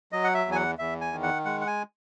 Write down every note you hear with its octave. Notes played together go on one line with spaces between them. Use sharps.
F#3 D#5
F#5
E5
E2
G#5
F#5
E2 E5
G#5
D#3
F#5
G#3 F#5
F#5
G#5